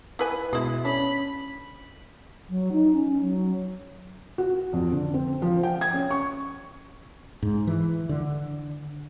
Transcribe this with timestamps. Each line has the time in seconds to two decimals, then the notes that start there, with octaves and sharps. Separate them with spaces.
0.19 E4 B4 G#5
0.53 B2 G#3 E4
0.85 C#4 D4 B5
2.49 F#3
2.72 D#4
2.93 C#4
3.21 F#3
4.38 F#4
4.73 F2
4.92 D3
5.14 C4
5.42 F3
5.63 G5
5.81 G#6
5.94 C#4
6.10 C#6
7.42 G#2
7.67 E3
8.09 D3